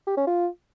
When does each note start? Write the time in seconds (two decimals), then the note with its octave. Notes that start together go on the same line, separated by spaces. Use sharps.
0.07 G4
0.17 C#4
0.27 F4